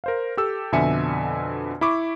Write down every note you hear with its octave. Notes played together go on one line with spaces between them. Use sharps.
A#4 C5 F5
G4 A4 E6
F2 B2 D3 E5 G#5 C#7
E4 B5 C#6 D6